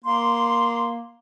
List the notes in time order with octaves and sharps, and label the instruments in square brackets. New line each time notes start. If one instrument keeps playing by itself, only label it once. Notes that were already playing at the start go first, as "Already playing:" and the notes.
[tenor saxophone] A#3 [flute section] C6